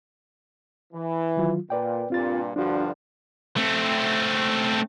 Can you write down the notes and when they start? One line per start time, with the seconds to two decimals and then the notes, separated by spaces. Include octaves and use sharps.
0.93 E3
1.37 D#3 F#3 F4
1.70 A#2 B4 D5 G5
2.10 G2 A#2 C4 F4 A6
2.56 G2 D3 F3 D4 F#4
3.57 A3 C4